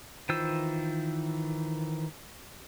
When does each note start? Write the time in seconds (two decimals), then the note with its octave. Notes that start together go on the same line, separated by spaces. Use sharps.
0.29 D#3 E3 F4 C5 E6